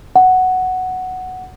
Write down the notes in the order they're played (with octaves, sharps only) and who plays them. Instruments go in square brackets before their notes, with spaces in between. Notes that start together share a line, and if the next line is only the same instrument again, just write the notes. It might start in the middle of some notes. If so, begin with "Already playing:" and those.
[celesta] F#5